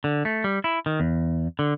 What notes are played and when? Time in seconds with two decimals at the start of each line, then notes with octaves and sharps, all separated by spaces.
0.04 D3
0.25 A3
0.44 G3
0.64 E4
0.86 D#3
1.00 E2
1.59 D3